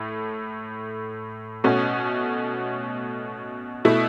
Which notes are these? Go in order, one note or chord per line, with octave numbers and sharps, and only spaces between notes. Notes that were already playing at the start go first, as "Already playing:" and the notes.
Already playing: A2 A3
B2 A3 C#4 F#4
B2 A3 E4